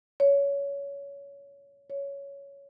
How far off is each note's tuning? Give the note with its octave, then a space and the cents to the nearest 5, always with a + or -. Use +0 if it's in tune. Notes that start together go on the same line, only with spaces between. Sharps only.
C#5 +20
C#5 +10